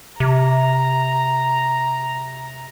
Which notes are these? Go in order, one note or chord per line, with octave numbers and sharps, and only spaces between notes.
C3 A#5